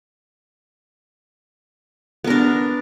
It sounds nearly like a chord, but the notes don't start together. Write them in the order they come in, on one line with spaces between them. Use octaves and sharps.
B3 A#4 D4